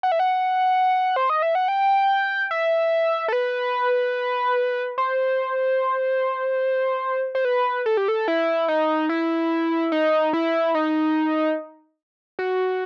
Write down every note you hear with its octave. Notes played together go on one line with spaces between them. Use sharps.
F#5
E5
F#5
C5
D#5
E5
F#5
G5
E5
A4
B4
C5
C5
B4
A4
G4
A4
E4
D#4
E4
D#4
E4
D#4
F#4